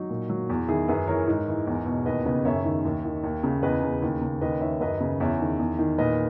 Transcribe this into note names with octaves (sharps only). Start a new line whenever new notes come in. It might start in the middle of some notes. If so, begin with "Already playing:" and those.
Already playing: F#3 D#4
A#2
F#3
E2
D#3 E4 G#4
F#2 G#4 B4
E3 A#4 C#5
G#2
E3
E2
B2
D#2 B4 D#5
C#3 B4 D#5
F#2 C#5 E5
D#3
D#2
D#3
D#2
C#3
E2 B4 D#5
C#3
D#2
C#3
D#2 B4 D#5
D#3 C#5 E5
F#2 B4 D#5
C#3
E2 C#5 E5
D#3
E2
D#3
A#2 B4 D#5